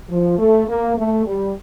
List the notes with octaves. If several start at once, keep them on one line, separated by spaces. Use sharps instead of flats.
F3
A3
A#3
A3
G3